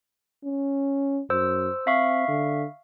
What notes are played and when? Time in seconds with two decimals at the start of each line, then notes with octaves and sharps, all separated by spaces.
0.45 C#4
1.30 F#2 C5 E6
1.87 C4 E5 F5 C#6
2.28 D3